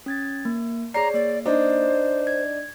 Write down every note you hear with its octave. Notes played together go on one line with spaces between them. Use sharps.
C#4 G#6 A6
A#3
G#4 C#5 D5 A#5 C7
A#3 D5
D4 D#4 C5
G#6